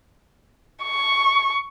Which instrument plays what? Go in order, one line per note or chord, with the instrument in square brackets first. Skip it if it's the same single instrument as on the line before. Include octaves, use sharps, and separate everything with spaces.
[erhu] C#6